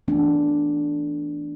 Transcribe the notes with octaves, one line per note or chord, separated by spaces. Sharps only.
E3 A3 B3 D4